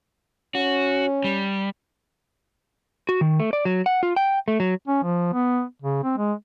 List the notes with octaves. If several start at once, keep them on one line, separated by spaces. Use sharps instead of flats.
C#4 F#4
G3
F#4
D#3
A3
D5
F#3
F#5
F4
G5
A3
F#3
C#4
F3
B3
C#3
C4
G#3